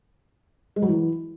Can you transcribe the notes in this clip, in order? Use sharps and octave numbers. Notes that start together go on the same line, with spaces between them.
G#3
F#3
E3